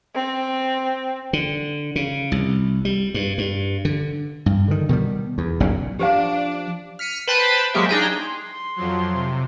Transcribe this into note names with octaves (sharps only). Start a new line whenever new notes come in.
C4
D3
C#3
C2
G3
G2
G2
D3
G2
D3 D#3
B2 D#3 E3 G3
E2
F#1 B1 A#2 C#3
F3 D4 G4 C5 F5
F6 B6 C#7 D#7
B4 C5 G5 A5 B5
F#3 G#3 A#3 G4 E5
D4 D#4 G#4 G5
C6
F2 F3 F#3
C3